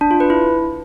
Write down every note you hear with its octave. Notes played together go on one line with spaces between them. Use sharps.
D4
F4
B4
E4